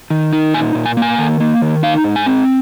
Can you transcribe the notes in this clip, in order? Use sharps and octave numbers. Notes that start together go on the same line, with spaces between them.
D#3
D#4
A#2 G#5
A#2
G#5
A#3
G#5
D#3
A#3
D#3
D#4 F5
G#2
G#5
C4